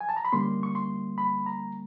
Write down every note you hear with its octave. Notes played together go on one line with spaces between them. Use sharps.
G#5
A5
A#5
B5
D3 G3 A#3 C#4 C6
C#6
C6
B5
A#5